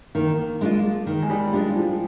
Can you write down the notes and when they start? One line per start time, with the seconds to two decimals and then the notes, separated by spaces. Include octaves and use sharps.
0.15 D#3 A#3
0.61 G#3 D4 F4
1.06 D#3
1.23 G#3
1.30 G3
1.52 G3 G#3 D4 F4
1.76 F3